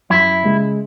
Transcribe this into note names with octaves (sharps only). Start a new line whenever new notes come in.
F#2 E4
C#3 G#3